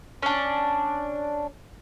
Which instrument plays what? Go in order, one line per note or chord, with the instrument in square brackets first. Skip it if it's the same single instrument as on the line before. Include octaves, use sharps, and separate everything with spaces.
[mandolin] C#4 D4